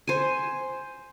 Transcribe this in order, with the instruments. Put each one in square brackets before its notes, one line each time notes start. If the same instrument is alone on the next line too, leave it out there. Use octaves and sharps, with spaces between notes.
[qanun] C5 G#5